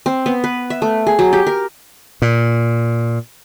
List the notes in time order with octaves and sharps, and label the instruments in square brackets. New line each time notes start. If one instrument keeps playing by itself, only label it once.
[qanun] C4
B3
B4
E5
A3
G#4
F#3
G4
A#4
[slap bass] A#2